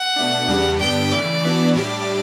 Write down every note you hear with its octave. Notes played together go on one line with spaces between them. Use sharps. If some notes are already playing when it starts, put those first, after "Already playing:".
Already playing: F#5
B2 A3 D4
E2 C#3 G3 D4 G4
G2 D3 G3 B3 D4 G5
C#3 E3 A3 D5
E3 B3 D4 F#4
A2 G3 D4 G4 D5